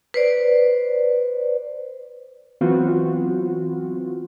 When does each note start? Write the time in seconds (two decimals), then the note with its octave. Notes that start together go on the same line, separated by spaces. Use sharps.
0.14 B4 C5 D5
2.61 E3 F#3 B3 C4 F4 F#4